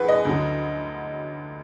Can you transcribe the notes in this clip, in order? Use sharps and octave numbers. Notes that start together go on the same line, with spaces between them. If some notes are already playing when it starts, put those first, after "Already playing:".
Already playing: A#1 F#4 G#4 B4
D#5
D2 D3 F#3